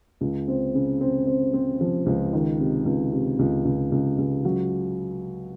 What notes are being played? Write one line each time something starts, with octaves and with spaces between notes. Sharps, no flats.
C#2
C4
C#3
C4
C4
C4
F3
C#2
D#3
C3
C#2
C3
C#2
C#2
C#2
C#2
F#3